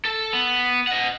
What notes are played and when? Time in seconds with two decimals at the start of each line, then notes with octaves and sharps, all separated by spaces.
0.05 A4 A5
0.33 B3
0.87 D#5 F#5